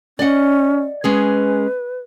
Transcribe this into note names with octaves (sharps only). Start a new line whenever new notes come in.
C#4 D5 D#5 F#5
G#3 C#4 G#4 B4